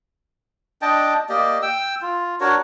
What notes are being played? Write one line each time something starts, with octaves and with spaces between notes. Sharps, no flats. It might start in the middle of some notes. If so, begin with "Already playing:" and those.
D4 D#5 G5 A5
A#3 G4 D5 D#5
G5 E6
F4
D4 F#4 A#4 C#5